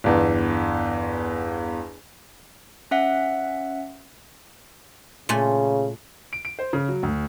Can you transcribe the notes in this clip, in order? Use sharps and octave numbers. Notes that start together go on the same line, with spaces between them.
G1 E2
C#4 E5 F#5
A#2 C#3 A3 G#5
D7
D7
C5
C#3
F#3
D2